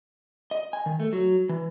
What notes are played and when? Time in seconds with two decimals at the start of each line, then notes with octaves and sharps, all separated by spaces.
0.51 D#5
0.73 G#5
0.86 D#3
1.00 A3
1.13 F#3
1.49 E3